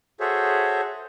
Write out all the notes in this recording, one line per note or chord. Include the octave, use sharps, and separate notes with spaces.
F#4 G#4 A4 C5 C#5 E5